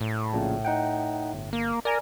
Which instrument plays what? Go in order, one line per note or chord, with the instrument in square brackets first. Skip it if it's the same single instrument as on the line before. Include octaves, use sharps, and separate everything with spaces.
[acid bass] A2
[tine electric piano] A#1 A#2 C#3
D#4 F#5 G5
G1
[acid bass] A#3
[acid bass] A#4 [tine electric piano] D5 G#5 A#5